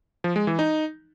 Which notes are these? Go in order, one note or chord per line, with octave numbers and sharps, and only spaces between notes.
F3
G#3
E3
D#4